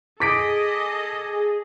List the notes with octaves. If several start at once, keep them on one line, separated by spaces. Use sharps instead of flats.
G#4 A4 D#5 D6 B6 D7